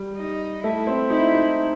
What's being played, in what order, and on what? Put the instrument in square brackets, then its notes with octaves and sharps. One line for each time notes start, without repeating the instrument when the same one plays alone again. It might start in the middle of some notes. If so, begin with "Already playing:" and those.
Already playing: [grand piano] G3
[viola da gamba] D#4
[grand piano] A3 [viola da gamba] E4
[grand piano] C4
[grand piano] D#4 [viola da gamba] E4
[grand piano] D#4